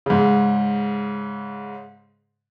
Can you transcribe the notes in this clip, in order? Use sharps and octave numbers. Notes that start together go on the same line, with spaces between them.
G#2 C#3